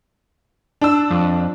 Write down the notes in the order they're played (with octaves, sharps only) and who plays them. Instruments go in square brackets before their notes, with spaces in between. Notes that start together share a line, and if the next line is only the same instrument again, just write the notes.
[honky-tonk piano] D4 E6
[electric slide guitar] F2